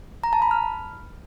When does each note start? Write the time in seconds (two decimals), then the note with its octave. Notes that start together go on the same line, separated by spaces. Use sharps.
0.24 A#5
0.33 A5
0.42 B5
0.51 F6